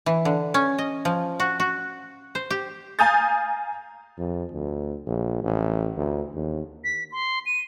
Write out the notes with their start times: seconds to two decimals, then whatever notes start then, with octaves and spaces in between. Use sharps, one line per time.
0.06 E3
0.25 D3
0.54 C#4
0.78 D#5
1.05 F3
1.40 F#4
1.60 F#4
2.35 C5
2.50 G4
2.99 F5 G#5 A#5 D#6 G6 A6
4.18 F2
4.52 D2
5.06 A#1
5.42 A1
5.97 D2
6.34 D#2
6.84 B6
7.12 C6
7.46 D#7